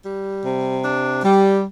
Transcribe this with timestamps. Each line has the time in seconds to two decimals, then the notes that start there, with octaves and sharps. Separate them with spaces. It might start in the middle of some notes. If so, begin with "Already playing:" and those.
0.04 G3
0.44 C3
0.83 D4
1.23 G3